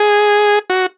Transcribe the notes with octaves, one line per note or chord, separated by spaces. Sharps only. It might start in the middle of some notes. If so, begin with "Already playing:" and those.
Already playing: G#4
F#4